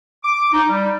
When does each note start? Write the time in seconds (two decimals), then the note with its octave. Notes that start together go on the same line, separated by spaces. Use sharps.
0.23 D6
0.52 D#4
0.69 G3